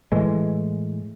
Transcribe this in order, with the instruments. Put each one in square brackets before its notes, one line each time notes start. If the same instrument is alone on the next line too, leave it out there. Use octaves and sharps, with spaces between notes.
[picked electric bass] A2 E3 G#3